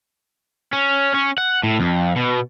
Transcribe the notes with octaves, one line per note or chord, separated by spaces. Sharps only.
C#4
C#4
F#5
A2
F2
B2